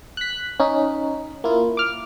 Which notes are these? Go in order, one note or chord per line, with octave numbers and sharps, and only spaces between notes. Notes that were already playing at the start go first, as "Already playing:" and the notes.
F#6 B6
C#4 D#4
A#3 E4 F4
D6 F6